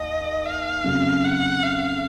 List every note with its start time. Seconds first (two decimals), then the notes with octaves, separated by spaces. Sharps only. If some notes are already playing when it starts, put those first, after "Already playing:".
Already playing: D#2 D#5
0.45 F5
0.84 F#1 F2 C#3 F#3
1.24 F#5
1.63 F5